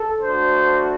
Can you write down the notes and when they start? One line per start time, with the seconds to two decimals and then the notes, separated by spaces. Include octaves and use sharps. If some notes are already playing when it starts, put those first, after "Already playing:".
Already playing: A4
0.21 A3 D4 F#4 C5